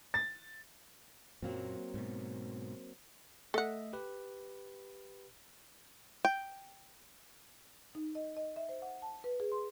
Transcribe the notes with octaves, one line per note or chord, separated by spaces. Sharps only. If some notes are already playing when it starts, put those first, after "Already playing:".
A6
F#2 A#2 F#3 A#3 C4
G#2 B2
A3 A4 D#5 E5 F#5
G4 B4
G5
D#4
D#5
D#5
E5
C5
F#5
A5
B4
G#4
C6